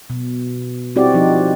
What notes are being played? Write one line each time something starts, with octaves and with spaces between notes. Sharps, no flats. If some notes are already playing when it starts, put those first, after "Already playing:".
B2
G3 C4 E4 F#4 G4 D5
F3 D#4